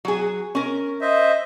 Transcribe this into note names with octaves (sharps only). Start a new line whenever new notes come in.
F#3 G#4
C#4 A#4
C5 D#5 E5